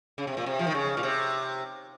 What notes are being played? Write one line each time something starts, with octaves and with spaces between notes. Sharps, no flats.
C#3
C3
A#2
C3
F3
D#3
C#3
A#2
C3